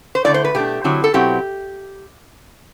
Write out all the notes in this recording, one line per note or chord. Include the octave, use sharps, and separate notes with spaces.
C5
D3 A3 E4 D5
C5
B4
B2 A3 D4 G4
D3 F#3 C4 E4
A4
B2 F#3 C4 E4 G4